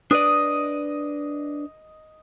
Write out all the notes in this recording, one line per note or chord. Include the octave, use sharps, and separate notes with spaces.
D4 B4 D5 D#5